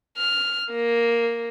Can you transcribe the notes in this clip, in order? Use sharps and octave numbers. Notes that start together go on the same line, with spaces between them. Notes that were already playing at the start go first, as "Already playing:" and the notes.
F6
A#3